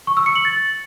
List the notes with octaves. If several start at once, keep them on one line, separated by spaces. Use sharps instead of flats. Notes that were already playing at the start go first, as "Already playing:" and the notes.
C#6
E6
C#7
F#7
A6